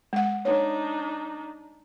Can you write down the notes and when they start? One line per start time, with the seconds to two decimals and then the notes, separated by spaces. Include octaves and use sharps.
0.13 G#3 F#5
0.45 D4 D#4 C#5